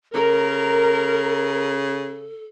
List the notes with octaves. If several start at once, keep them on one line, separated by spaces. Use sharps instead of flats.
C#3 A4 A#4